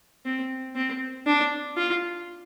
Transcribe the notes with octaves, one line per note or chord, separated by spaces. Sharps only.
C4
C4
D4
F4